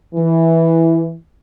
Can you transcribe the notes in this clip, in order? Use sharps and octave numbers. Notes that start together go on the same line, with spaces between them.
E3